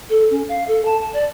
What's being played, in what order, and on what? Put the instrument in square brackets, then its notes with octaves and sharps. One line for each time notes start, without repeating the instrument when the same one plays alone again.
[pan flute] A4
C#4
F5
A4
A5
A5
D5